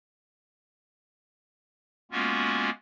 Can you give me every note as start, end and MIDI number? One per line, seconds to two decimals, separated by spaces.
2.12 2.70 56
2.12 2.70 58
2.12 2.70 59
2.12 2.70 61
2.12 2.70 65
2.12 2.70 66